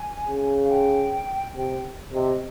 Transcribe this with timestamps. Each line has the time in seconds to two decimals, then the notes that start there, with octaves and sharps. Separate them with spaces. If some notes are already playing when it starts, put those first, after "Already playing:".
Already playing: G#5
0.28 C#3
0.65 F5
0.71 G5
1.56 C3 G5
2.13 C3 D#5